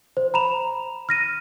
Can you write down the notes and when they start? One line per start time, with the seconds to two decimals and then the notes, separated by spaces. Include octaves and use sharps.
0.17 C5
0.34 A#5 B5 E7 F7
1.09 F6 A#6 D#7